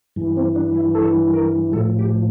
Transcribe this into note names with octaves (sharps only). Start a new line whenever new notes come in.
G2 E3
C4
D4
E4
A4
A#4
A2 F3 A4
G4